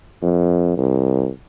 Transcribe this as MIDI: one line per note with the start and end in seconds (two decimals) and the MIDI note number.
0.22 0.75 41
0.77 1.29 36